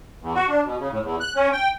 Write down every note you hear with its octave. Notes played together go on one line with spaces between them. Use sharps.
E2
F#4
D4
B2
C#3
A2
E2
F#6
C#4
G5